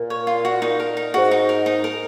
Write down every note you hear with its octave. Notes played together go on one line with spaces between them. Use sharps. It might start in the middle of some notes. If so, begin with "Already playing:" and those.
Already playing: A#2
C#5
F4
F#4
D#4
A#4
D#4
G#2 F#4
D#4
A#4
D#4
A#4